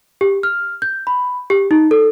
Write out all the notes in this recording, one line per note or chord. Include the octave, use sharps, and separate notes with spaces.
G4
F6
G6
B5
G4
D#4
A4